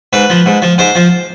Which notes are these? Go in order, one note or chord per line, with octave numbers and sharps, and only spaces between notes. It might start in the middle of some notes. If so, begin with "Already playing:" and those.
G#2 B4
F3
G#2
F3
G#2 C5
F3